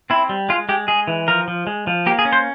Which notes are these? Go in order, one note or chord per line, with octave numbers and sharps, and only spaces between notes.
C4 E4
G3
G#3 F4
G#3 G4
G#3 G#4
E3
F3 A#4
F3
G#3
F3
A#3 G4
G#4
C#4
C5